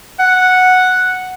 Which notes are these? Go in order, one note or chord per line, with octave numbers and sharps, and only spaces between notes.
F#5